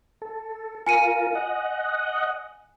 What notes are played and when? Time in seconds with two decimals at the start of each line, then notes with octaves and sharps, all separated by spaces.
0.22 A4
0.86 F4 A#4 G#5 C#7 D#7
1.35 D#5 F#5